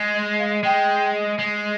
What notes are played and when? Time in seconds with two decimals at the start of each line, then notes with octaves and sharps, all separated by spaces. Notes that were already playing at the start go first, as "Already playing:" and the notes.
Already playing: G#3
0.15 D#5
0.39 F5
0.63 G#3 G5
1.39 G#3